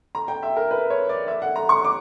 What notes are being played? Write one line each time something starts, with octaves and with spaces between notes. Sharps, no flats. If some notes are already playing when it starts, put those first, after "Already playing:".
A#5
G5
E5
A#4
B4
C#5
D5
E5
F#5
A#5
C#6
D6